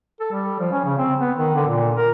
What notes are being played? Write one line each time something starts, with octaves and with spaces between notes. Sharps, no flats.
A4
G3
F3
C#4
C#3
C4
B3
D#3
D3
A#2
A#4